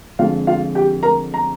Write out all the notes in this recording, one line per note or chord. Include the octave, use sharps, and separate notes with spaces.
F2 D3 G#3 F4 F5
F4 F5
G4 G5
A#4 A#5
A#5